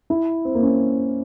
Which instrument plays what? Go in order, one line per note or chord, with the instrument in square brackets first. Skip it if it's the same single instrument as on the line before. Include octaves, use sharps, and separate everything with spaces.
[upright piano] E4
C4
A#3
C#4